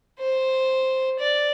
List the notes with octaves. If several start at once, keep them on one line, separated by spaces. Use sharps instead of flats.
C5
D5